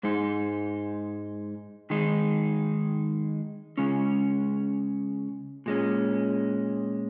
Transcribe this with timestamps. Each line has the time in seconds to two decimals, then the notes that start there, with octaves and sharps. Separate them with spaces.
0.03 G#2 G#3 D#4
1.90 D#3 G#3 D#4
3.77 C#3 G#3 C#4
5.66 A#2 G#3 C#4